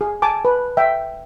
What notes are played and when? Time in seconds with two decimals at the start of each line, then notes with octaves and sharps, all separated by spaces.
0.01 G#4
0.22 G#5 A5 D6
0.45 B4
0.77 E5 G5